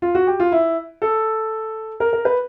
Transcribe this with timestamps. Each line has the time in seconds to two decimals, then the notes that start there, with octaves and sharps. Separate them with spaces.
0.02 F4
0.15 F#4
0.27 G4
0.40 F4
0.52 E4
1.02 A4
2.00 A#4
2.13 A#4
2.25 B4